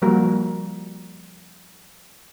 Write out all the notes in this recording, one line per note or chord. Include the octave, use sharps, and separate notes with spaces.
F3 G3 A#3 F#4 A#4